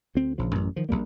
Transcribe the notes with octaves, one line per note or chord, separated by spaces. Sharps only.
D2 C4
A#1 C#3 F3
A1 F#2
D#3 F3
A#1 D#2 G3 A#3